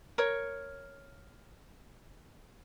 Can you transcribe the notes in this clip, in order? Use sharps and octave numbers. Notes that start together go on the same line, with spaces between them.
A#4 C#5